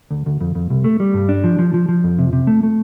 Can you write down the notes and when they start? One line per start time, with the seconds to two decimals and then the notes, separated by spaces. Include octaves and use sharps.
0.11 D2
0.26 D2
0.41 F2
0.55 F2
0.70 C2
0.84 A3
1.00 G3
1.14 G2
1.29 D4
1.44 F3
1.59 F3
1.74 F3
1.89 F3
2.04 F2
2.19 C3
2.33 C3
2.47 A3
2.63 A3